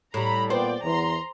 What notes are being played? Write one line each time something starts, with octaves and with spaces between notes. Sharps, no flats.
A2 G3 A#5 B5
A#2 B3 C5 D5 G5
E2 A#5 C6